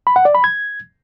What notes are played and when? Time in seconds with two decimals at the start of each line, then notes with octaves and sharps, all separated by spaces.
0.07 B5
0.16 F#5
0.25 D5
0.35 B5
0.44 G#6